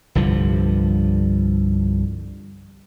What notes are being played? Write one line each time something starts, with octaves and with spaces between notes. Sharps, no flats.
C2 G2 D3 F3